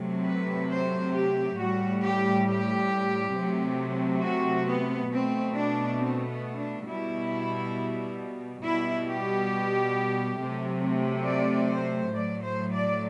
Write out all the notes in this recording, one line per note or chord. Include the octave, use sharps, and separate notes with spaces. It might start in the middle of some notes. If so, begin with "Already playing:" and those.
Already playing: C3 F#3 A3
B4
C5
G4
A2 G3 F#4
G4
G4
C3 F#3 A3
F#4
B3
B2 A3 C4
D4
C4
B3
D4
B2 G3 E4
B2 G3 E4
G4
C3 F#3 A3
D5
C5
A2 F#3 A3 D5
C5
D5